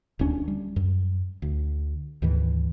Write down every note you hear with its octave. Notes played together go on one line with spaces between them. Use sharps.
D#1 D2 C#4 D4
G3
F#2
D2
D2 G#2 D#3 E3